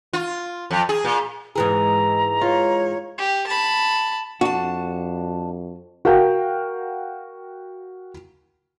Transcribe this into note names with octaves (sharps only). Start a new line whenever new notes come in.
F4
F2
G#4
A#2
G#2 E3 G#4 A#5
F4 C#5
G4
A5 B5
F2 D4 F#4 A5
F#4 A#4 F5 G5